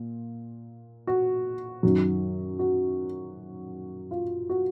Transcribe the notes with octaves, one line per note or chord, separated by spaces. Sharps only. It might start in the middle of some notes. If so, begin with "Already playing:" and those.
Already playing: A#2
F#4
F#2 D#3 F#3
F#4
F4
F#4